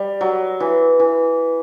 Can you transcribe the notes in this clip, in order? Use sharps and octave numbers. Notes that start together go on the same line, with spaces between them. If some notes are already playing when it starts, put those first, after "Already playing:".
Already playing: G3
F#3
E3
E3